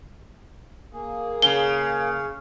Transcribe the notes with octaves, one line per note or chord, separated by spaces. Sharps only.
A#3 G#4
C#3 G7